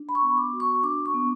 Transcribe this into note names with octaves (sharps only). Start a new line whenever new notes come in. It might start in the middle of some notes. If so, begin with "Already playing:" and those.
Already playing: D4
B5
C#6
B3
D6
F#4
C#6
D4 D6
C#6
B3